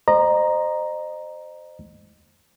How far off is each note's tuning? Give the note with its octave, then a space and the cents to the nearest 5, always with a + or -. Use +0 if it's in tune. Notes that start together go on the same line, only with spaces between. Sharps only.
C5 +0 D#5 -30 A#5 +5